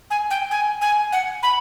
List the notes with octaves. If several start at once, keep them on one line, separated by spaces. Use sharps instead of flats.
G#5
G5
G#5
G#5
F#5
B5